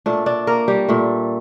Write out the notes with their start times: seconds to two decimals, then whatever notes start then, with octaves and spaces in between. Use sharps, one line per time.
0.06 A#2 A3 D4 D5
0.26 D4 D5
0.47 A#3 A#4
0.68 G3 G4
0.89 A#2 A3